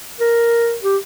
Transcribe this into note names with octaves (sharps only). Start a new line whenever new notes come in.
A#4
G4